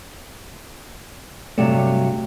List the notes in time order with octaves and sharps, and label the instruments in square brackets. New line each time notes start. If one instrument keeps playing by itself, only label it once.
[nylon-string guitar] G2 C3 F#3 [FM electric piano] A3